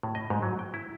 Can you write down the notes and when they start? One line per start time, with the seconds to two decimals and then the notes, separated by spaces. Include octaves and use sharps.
0.03 A2
0.15 D#5
0.30 G#2
0.42 F#3
0.59 G5
0.74 E4